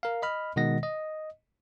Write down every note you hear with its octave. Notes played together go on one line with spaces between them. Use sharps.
A#4 F5
D#5 B5 F6
B2 D#3 G#3 D#5 F#5 A#6
D#5